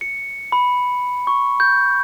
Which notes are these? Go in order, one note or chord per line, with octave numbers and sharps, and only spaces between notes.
C#7
B5
C#6
G6